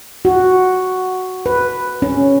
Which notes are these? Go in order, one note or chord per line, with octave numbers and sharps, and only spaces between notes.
F#4
B4
C#4